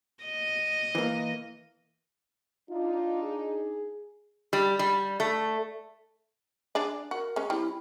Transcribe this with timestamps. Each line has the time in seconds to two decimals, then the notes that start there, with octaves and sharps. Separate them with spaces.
0.24 D#5
0.95 E3 A#3
2.70 D4 D#4 F4
3.23 G#4
4.53 G3
4.79 G3
5.20 A3
6.75 D4 G#4 D5
7.11 F#4 A#4
7.36 G#3 C#4
7.50 G3 C4 E4